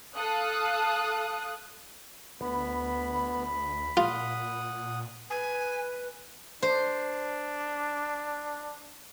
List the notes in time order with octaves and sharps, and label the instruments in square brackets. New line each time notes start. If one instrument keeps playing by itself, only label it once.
[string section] A4 F5 D#6 F#6
[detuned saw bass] D2 [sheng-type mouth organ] B3 [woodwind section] B5
[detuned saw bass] A#2 [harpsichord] F4 [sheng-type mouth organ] F#5 D#6
[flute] B4 [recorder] G#5
[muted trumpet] D4 [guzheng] C5